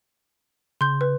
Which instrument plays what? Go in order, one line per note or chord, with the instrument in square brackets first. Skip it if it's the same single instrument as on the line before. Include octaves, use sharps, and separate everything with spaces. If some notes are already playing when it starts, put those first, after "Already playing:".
[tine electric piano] C#3 [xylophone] C6 G6
[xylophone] B4